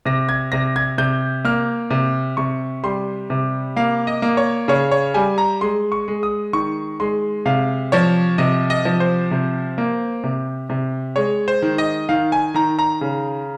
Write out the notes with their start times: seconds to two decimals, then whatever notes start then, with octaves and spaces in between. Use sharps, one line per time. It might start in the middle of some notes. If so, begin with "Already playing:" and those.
0.05 C3 A#6
0.29 G#6
0.52 C3 A#6
0.76 G#6
0.98 C3 G6
1.45 A#3 F6
1.90 C3
2.37 C3 C#6
2.83 G3 C6
3.30 C3
3.76 A#3 F5
4.07 D#5
4.22 A#3
4.37 C#5
4.68 C#3 C#5
4.91 C#5
5.14 G3 G#5
5.38 A#5
5.61 G#3 C6
5.92 C#6
6.08 G#3
6.23 D#6
6.53 D#3 C#6
7.00 G#3 C6
7.46 C3 F5
7.92 F3 C#5
8.38 C3 D#5
8.70 D#5
8.85 F3
9.00 C5
9.31 C3
9.78 A#3
10.24 C3
10.70 C3
11.16 G#3 C#5
11.48 C5
11.62 D#3
11.78 D#5
12.09 D#3 F5
12.32 G#5
12.54 D#3 A#5
12.79 A#5
13.01 C#3